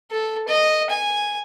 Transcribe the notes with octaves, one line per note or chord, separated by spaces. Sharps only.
A4
D#5
G#5